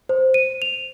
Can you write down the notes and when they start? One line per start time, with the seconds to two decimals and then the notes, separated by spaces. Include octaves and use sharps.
0.09 C5
0.34 D#7
0.62 F7